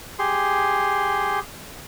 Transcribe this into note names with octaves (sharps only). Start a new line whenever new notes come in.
G4 G#4 C6